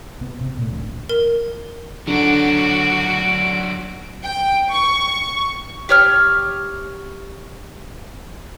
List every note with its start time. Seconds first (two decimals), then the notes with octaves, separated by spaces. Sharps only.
0.21 C3 B3
0.41 C3
0.58 A#2 A3
0.70 D1 A1 D2
1.09 A#4
2.07 D3 F#3 D4 F#4 D7
4.23 G5
4.71 C#6
5.89 G4 C#5 F6